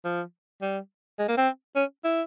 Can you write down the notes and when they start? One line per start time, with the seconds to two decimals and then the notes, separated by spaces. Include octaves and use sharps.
0.04 F3
0.62 G3
1.19 G#3
1.28 A#3
1.37 C4
1.76 C#4
2.05 E4